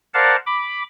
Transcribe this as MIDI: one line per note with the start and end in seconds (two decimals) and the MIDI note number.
0.14 0.36 70
0.14 0.36 72
0.14 0.36 74
0.14 0.36 77
0.14 0.36 78
0.14 0.36 81
0.46 0.83 83
0.46 0.83 86